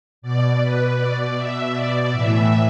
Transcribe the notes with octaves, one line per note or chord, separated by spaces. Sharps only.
B2 D5
B2 B4
B2 D5
B2 E5
B2 D5
A2 E3 E5